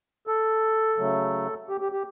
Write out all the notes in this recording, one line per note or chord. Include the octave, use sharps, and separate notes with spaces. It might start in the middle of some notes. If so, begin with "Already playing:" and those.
A4
C#3 F#3 A3
G4
G4
G4